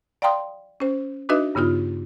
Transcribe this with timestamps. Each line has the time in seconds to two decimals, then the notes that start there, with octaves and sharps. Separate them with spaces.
0.22 D5 F5 G5 A#5 C6 D#6
0.80 C#4 C5
1.29 D4 D#4 F#4 B4 D#5 E5
1.55 G2 C#3 B3 D#4 F4